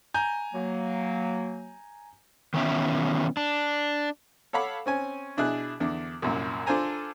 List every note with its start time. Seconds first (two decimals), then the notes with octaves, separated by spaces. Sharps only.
0.14 G#5 A#5 G6
0.53 F#3 A#3
2.54 D#3 E3 B3 C#4 E5 G5
3.37 D4
4.53 A4 C#5 F5 F#5 B5 D6
4.86 C4 C#4 G#5
5.37 B2 D4 E4 G#4 F#6
5.80 E2 D3 D4
6.22 C2 F#2 A#2
6.66 D4 F4 A4 C5 G#5 A#5